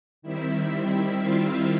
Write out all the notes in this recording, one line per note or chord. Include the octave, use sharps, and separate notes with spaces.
D#3 G3 C4 E4 E5
F4 F5